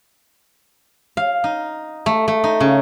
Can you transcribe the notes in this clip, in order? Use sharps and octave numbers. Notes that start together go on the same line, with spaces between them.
F5
D#4
A3
A3
D#4
C#3